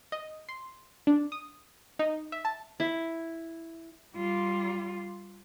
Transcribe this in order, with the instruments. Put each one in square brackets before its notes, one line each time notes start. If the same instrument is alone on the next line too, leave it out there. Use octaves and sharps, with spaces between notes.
[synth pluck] D#5
C6
D4
D#6
D#4
E5
A5
[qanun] E4
[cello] G3 F4